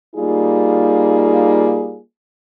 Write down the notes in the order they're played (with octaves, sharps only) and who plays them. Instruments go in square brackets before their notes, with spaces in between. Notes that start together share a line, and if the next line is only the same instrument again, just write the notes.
[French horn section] G3 A#3 D#4 F4 G#4